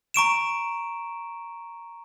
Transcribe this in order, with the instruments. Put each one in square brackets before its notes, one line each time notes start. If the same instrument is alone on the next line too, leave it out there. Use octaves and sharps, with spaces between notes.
[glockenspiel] A#5 C#6 D7 E7